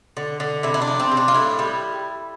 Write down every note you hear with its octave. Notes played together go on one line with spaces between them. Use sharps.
D3
D3
C3 E4
E4
D4
F3
C4
C3
D4
F4
A2 E4
G3